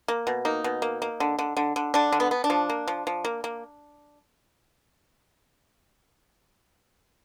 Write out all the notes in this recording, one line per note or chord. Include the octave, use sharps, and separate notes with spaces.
A#3
B2
A#3 D#4
B2
A#3
A#3
D3
D3
D3
D3
D3 D4
D3
B3
B3
D4
F3
A#3
F3
F3
A#3
A#3